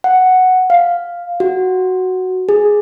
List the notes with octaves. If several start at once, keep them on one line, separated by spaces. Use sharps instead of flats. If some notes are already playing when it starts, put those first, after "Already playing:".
F#5
F5
F#4
G#4